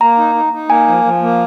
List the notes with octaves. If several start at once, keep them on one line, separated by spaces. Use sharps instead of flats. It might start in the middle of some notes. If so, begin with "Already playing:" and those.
A#3 A#5
D#4
D#4
D#4
A#3 G#5
F3
F3
A#3